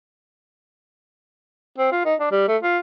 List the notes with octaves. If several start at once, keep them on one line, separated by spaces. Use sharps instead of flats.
C4
F4
D#4
D4
G3
A3
F4